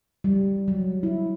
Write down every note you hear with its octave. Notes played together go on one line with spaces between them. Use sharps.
G3
F#3
E4